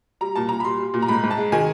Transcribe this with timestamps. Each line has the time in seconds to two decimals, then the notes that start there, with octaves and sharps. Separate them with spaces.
0.21 G3 A#5
0.36 A#2 A5
0.49 A#2 A#5
0.60 B5
0.64 G3 C6
0.80 G3
0.94 A#2
1.02 A#5
1.08 G#2 B5
1.23 G#2
1.31 A5
1.38 G#3
1.52 D#3 G#5